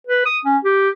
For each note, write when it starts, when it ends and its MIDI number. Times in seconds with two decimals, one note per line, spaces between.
0.07 0.25 71
0.26 0.38 87
0.45 0.57 61
0.65 0.89 67